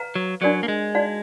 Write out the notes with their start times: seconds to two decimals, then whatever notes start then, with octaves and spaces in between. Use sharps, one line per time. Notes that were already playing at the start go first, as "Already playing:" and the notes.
Already playing: B4 F5 A#5
0.16 F#3
0.42 F#3 D4 F#4 A#4 D5
0.63 A#3
0.68 G#3
0.95 D#4 F#4 D5 F5